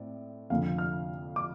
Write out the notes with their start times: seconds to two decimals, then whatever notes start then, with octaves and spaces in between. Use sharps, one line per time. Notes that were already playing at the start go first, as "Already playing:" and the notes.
Already playing: A2 C4 D5
0.50 F1 F2 D3 F5
0.78 F6
1.36 D6